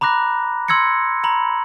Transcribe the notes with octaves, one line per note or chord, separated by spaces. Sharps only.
A#5 B5 D6 F#6 A#6
C6 E6 G#6 A#6 C#7
A#5 B5 F#7